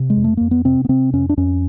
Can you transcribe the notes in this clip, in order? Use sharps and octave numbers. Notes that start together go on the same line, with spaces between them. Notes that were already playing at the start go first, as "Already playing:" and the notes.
Already playing: C3
G#3
F2
A3
F2 A#3
B3
C3 C4
B3
C3 C4
F2 C#4
D4
F2 C#4